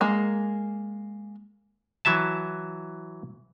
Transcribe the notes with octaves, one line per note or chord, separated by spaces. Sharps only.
G#3 A#3
E3 F#3 E5 A5